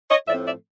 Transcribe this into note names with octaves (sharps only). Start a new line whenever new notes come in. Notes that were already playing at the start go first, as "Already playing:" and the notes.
C#5 D#5
A2 F3 A3 C4 D5 E5
D5 E5